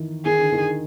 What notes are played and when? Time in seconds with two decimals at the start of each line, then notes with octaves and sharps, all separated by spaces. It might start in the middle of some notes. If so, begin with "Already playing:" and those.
Already playing: D#3 E3
0.25 D#3 G#4
0.39 D3
0.52 D#3